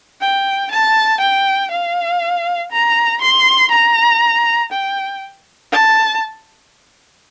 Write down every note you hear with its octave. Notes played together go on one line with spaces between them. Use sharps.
G5
A5
G5
F5
A#5
C6
A#5
G5
A5